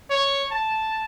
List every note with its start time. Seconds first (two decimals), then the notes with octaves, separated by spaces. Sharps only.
0.10 C#5
0.51 A5